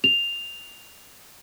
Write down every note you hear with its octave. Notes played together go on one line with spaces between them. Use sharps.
F7